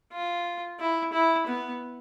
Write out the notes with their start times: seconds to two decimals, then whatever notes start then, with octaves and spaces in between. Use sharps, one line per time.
0.12 F4
0.79 E4
1.12 E4
1.47 B3